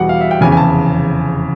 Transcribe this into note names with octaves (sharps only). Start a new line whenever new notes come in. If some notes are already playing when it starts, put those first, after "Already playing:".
Already playing: E2 B2 G3 F#5
F5
E5
G5
F1 E2 C#3 G#5
G#5
A5